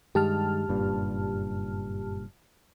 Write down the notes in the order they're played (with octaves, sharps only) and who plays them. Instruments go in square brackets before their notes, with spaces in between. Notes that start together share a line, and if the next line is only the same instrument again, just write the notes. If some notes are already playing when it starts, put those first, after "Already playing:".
[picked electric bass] G2 D#3 G#3 [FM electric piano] G4 A5 F6
[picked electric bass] F#1 G2 A#2